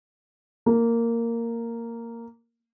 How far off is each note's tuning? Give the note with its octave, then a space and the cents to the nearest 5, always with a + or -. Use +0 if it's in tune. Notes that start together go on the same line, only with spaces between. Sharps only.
A#3 -10